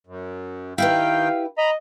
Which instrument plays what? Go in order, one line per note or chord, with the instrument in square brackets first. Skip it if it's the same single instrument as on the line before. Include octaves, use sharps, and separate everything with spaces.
[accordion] F#2
[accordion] D#3 G5 [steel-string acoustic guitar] E4 G4 B4 [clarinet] F5
[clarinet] D#5 [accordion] A#5 B5